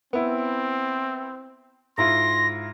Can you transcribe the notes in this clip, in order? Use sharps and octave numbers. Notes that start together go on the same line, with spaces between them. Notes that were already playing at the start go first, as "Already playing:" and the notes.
B3 C4 E4
G#2 E4 F4 C6 A#6